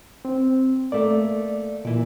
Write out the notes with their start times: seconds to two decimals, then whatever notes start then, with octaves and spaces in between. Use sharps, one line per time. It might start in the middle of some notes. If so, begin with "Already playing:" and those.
0.25 C4
0.92 A3 A#3 D5
1.85 A#2 E3 D5